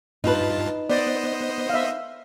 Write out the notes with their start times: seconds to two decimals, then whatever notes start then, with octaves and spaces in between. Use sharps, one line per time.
0.24 G2 D#4 F4 B4 A5
0.90 B3 C5 D5 D#5
1.69 E5 F5